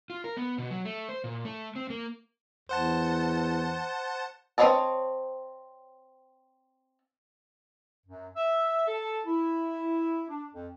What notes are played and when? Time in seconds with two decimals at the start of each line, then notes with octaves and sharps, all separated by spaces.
0.10 F4
0.24 A#4
0.37 B3
0.58 B2
0.70 F#3
0.85 A3
1.09 C5
1.24 A#2
1.45 A3
1.76 C4
1.90 A#3
2.69 E2 C5 F#5 A5
4.58 C4 D#4 C#5 D#5 A5
8.07 F#2
8.36 E5
8.88 A4
9.25 E4
10.29 D4
10.53 F2